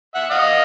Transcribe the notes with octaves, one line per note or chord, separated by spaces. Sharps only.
E5 F#5
D#5 F5